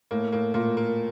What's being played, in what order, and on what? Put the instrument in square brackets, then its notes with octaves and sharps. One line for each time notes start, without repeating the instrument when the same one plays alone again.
[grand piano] A2 [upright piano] A#3
[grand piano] A2 [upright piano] A#3
[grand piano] A#2 [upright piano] A#3
[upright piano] A#3